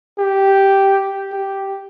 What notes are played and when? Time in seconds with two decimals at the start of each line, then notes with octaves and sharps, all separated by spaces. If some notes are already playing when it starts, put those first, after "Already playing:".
0.19 G4
1.32 G4